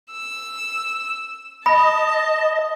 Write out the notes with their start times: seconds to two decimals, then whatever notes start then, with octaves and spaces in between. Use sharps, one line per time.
0.11 E6
1.66 D#5 A5 B5